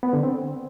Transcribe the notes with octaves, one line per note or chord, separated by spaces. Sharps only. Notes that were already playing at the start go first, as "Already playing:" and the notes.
B3
D3
C4